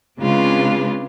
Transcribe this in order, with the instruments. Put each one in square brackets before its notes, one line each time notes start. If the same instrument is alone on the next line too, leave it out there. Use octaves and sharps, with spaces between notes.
[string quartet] C#3 G#3 C4 D4 F4 B4